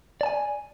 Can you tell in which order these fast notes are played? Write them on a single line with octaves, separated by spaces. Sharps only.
D5 A5 G#5